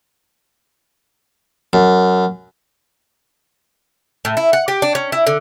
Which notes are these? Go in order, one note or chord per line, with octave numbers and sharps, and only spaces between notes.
F#2
A2
E4
F#5
G4
D4
C#4
E4
D3